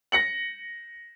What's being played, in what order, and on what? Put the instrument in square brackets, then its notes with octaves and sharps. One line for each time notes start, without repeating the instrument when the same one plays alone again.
[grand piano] A#6 C#7 F#7